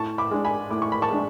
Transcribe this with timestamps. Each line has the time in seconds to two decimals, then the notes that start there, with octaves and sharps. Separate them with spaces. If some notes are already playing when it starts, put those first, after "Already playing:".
Already playing: A2 A5 C#6
0.18 B5 D6
0.31 G#3 D4
0.45 G#5 B5
0.71 A2 D6
0.82 C#6
0.92 B5
1.02 A5 C#6
1.10 G#3 D4